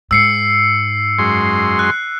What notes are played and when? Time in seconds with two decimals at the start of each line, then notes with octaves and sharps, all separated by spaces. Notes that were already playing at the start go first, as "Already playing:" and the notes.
0.11 G#2 E6 C7 C#7
1.19 F#2 G#3 C6
1.79 F#6